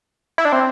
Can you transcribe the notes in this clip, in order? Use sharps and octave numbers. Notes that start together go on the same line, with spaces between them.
E4
D4
C4